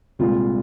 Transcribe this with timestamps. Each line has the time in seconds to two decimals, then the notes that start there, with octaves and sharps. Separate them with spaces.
0.19 C2 A#2 G#3 F4